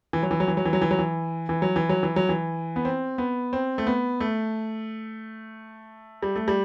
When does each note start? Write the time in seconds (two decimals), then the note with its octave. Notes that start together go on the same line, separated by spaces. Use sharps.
0.13 E3
0.23 F#3
0.31 E3
0.40 F#3
0.48 E3
0.57 F#3
0.65 E3
0.73 F#3
0.81 E3
0.91 F#3
0.99 E3
1.49 E3
1.62 F#3
1.76 E3
1.89 F#3
2.03 E3
2.16 F#3
2.29 E3
2.76 B3
2.85 C4
3.18 B3
3.53 C4
3.78 A3
3.87 B3
4.20 A3
6.23 G3
6.36 A3
6.48 G3